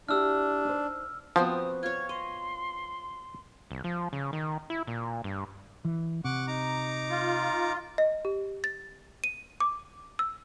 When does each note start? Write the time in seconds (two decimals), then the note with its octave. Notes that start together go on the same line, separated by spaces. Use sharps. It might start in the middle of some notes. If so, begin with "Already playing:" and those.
0.09 D4 E4 F#4 G4 E6 F6
0.65 D#4 C5
1.36 F3 B3 C4 F#4 D#6
1.83 F4 C#5 G#6
2.09 D#5 C6
3.71 C2
3.84 F3
4.13 C#3
4.33 D#3
4.70 E4
4.87 A#2
5.24 G2
5.85 E3
6.24 C3 F#5 C#6 D6
6.47 D#4 A#5 D6
7.10 F4
7.98 D#5
8.25 G4
8.64 A6
9.24 D#7
9.60 D6
10.19 E6